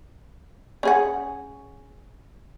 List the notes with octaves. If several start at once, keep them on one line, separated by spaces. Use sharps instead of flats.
C#4 G#4 F#5